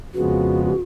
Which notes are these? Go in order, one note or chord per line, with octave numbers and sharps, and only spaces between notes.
F2 C#3 F3 G#3 B3 F#4